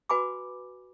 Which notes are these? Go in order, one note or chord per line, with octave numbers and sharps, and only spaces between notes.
F#4 B4 G#5 B5 D6